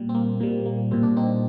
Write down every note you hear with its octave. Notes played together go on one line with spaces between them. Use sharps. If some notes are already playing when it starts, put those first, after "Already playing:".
Already playing: A#2 G3
C4
A#3
A#2 G3 A#3
A#3
A#2 G3 C4
D4
C4 D#4